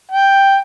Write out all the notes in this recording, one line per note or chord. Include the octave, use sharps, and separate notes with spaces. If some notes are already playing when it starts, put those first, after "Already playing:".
G5